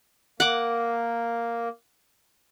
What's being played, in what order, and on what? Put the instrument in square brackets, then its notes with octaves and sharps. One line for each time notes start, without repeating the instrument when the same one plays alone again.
[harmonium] A#3 [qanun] F#5 D6